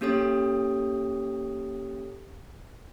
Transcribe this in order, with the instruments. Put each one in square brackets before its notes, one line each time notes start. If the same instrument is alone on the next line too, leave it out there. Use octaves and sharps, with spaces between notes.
[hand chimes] A#3 C#4 G4 A4 C#5 D#6